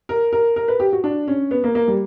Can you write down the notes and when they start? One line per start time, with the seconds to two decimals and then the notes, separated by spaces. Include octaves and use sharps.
0.09 A#4
0.33 A#4
0.56 A#4
0.68 B4
0.80 G4
0.93 F#4
1.04 D4
1.28 C#4
1.51 B3
1.64 A#3
1.75 A#3
1.88 G3